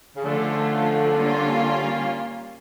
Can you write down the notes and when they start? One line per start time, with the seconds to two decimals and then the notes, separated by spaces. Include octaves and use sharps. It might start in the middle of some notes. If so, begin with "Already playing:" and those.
0.16 C#3
0.24 D3 F3 A3 C#4 F4
1.16 G3 A#3 C#4 F4